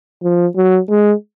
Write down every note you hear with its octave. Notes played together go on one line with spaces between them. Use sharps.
F3
F#3
G#3